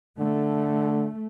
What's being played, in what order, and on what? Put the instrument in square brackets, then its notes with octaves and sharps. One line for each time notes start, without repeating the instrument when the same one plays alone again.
[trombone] D3 [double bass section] A3